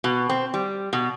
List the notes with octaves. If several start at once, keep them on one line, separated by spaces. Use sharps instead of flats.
B2
C4
G3
B2